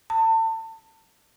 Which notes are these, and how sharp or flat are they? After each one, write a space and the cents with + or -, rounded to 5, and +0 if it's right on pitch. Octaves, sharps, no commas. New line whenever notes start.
A5 +30